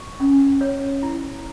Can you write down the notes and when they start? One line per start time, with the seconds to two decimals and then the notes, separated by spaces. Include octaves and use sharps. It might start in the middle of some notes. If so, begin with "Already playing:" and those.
Already playing: C#6
0.20 C#4
0.61 C#5
1.03 E4